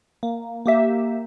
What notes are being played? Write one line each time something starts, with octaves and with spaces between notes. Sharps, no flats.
A#3
A#3 G4 E5